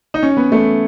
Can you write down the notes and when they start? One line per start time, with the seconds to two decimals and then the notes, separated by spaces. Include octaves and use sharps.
0.14 D#4
0.23 C#4
0.37 B3
0.52 A3